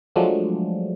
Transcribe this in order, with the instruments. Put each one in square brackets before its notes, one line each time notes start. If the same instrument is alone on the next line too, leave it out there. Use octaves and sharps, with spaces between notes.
[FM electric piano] F3 F#3 G#3 A3 D4